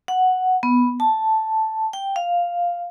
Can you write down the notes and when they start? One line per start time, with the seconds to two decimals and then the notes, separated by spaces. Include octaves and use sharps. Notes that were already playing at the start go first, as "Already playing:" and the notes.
0.08 F#5
0.63 B3
1.00 A5
1.93 G5
2.16 F5